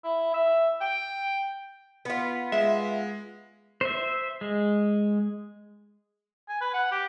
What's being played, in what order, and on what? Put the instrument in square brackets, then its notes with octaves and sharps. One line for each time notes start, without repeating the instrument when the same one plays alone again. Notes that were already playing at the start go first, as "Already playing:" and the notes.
[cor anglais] E4
E5
G5
[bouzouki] B3 F4
[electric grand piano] G#3 [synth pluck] E5
[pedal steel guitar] C5 E5
G#3
[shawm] G#5
B4
F#5
G4